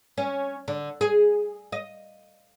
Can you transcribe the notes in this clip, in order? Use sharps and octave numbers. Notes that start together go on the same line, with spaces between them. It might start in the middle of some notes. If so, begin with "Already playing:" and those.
C#4
D3
G#4
D#5